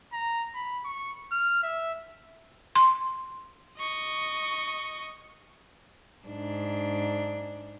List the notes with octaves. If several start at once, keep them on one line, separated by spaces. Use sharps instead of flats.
A#5
B5
C#6
F6
E5
C6
D#5 C#6
G#2 D4